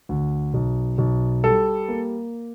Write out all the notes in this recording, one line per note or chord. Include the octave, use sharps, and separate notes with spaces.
D2
B1
B1
G3 A4
A#3